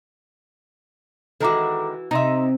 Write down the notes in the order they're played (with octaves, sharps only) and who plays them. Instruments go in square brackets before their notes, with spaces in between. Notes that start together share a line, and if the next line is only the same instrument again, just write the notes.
[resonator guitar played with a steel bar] D#3 G#3 E4 [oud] E3 F#4 [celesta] A4 A#5 D6
[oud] C3 [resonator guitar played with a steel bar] D#4 D#5 E5 [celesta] A#5 C6